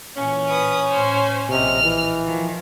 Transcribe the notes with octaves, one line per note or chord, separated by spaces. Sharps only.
A#2 E3 C#4
B4 D#6
A2 C5 G#5
A#1 C3 D#5 F6
E3
D#3 F3